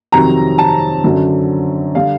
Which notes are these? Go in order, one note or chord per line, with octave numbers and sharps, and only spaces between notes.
F2 C3 D#3 F#3 A#5
A5
F#2 D3 F#3
D3 G3 F5